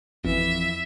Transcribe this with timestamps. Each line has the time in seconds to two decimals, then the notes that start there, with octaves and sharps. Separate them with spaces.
0.25 G#1 F2 E3 E5